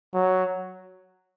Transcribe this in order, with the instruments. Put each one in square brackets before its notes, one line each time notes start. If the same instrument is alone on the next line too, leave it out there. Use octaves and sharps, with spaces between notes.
[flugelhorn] F#3